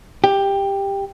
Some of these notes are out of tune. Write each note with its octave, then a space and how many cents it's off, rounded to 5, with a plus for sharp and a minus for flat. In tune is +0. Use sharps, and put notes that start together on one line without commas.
G4 +10